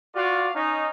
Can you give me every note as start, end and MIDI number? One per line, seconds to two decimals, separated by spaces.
0.16 0.48 65
0.16 0.48 66
0.16 0.48 74
0.16 0.48 77
0.55 0.88 61
0.55 0.88 63